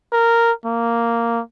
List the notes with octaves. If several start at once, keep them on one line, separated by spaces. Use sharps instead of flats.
A#4
A#3